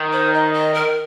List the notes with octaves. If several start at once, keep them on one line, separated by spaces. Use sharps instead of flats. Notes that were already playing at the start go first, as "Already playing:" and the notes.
Already playing: D#3
C5
D#5
D#5
A#4